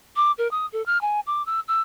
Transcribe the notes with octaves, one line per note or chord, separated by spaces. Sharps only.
D6
A#4
D#6
A4
F6
G#5
D6
E6
E6